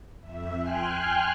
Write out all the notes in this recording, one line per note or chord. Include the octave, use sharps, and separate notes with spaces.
F2 E5
G5 G#5 C6 F6 F#6